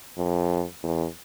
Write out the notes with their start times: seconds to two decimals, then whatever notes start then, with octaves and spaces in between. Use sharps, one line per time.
0.17 F2
0.83 E2